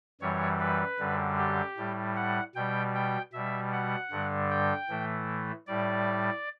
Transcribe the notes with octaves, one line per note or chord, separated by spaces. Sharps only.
F#2 E3 G3 C#5
B4
F#2 D3 G3
G4
A2 G3
F#5
B2 G3 G5
G5
B2 G3 E5
F#5
G2 D3 G3
G5
A2 E3 A3
A2 G3 D5